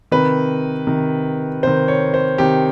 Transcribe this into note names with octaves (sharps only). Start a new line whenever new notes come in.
C3 D#3 B4
C3 D#3
C3 D#3 C5
C#5
C5
C3 D#3 G4